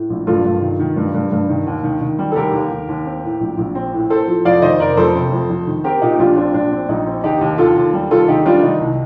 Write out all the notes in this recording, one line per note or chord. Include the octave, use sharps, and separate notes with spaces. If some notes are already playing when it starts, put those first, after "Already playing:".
Already playing: A2
A#1
G2 F4 A4
G2
D#3
D#3
G2
G2
G2
D#3
D#2
D#3
D#3
G3
A4
D#2 G4 A#4
D#2
D#2
D#2
C4
A2
A#1
A#1
C4
A2
A2 A4 C5
F3
F2 D5 F5
D#3 C5 D#5
F1 A#4 D5
F2 A4 C5
C3
F2
F2
D#3
C4 G4 A#4
A#2 D#4 G4
G4
A#1 D4 F4
C4 D4 F4
A#1 D4
C4
A#1 D#4
C4
D#2 D#4 G4
D#2
D#2 F4 A4
D#2
G3
D#2 F4 A4
D#3 D#4 G4
G3 D4 F4
D#3 D#4
C2